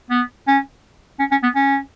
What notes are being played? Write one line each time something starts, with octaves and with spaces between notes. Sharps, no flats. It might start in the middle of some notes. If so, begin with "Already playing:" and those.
B3
C#4
C#4
C#4
B3
C#4